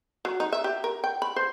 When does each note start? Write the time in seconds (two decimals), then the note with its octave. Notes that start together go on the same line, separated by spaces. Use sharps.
0.25 F#3
0.40 D#4
0.52 E5
0.64 G4
0.84 A#4
1.04 G5
1.22 B5
1.36 C5